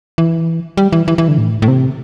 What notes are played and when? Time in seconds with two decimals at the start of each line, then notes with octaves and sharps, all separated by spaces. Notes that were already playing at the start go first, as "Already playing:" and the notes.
0.18 E3
0.77 G3
0.92 E3
1.08 E3
1.18 E3
1.28 D3
1.38 A2
1.62 A2
1.68 C3